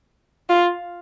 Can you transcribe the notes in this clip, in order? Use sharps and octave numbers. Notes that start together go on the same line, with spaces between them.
F4